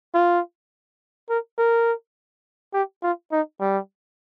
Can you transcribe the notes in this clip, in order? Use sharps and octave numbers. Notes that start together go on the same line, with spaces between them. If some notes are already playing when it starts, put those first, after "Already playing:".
F4
A#4
A#4
G4
F4
D#4
G3